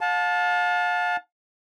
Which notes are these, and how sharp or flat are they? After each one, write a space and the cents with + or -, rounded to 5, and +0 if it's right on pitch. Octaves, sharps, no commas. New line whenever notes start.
F5 +40 A5 -15